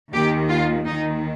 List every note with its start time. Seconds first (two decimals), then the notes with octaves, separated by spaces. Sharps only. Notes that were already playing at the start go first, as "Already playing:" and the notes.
0.13 D#2 D#3 G4
0.49 F4
0.86 D#2 D#3 D#4